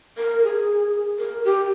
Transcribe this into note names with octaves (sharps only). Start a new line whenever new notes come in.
A#4
G#4
A#4
G4